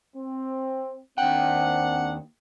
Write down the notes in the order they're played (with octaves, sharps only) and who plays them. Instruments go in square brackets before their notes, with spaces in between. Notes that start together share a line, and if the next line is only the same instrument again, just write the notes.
[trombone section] C4
[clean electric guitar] D#2 G5 [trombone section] C4 D4 [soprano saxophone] F#5